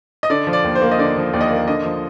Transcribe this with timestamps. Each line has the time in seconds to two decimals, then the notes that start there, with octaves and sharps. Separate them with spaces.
0.23 D#5
0.30 D3 D5
0.47 F3
0.53 D5
0.64 D#2
0.75 C5
0.82 A#3
0.91 D#5
0.99 D3 D5
1.16 F3
1.33 D#2 D5
1.41 D#5
1.48 A#3 D5
1.68 D3 D#5
1.84 F3